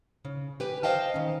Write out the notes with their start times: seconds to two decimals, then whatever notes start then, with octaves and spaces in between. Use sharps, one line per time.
0.25 C#3
0.60 G4 B4 G#5
0.83 C5 D#5 F5 G5 A5
1.14 D#3 C#4